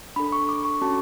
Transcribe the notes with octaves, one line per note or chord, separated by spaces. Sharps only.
D4 A4 B5
C#6
D6
C#6
C#4 F#4 A4 A5